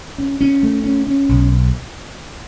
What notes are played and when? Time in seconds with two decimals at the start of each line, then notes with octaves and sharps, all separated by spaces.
0.18 C#4
0.41 C#4
0.63 A3
0.84 C#4
1.07 C#4
1.29 B1